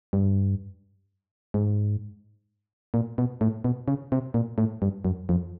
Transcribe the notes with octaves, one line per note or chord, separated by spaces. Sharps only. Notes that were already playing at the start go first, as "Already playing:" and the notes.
G2
G#2
A#2
B2
A2
B2
C#3
C3
A#2
A2
G2
F#2
F2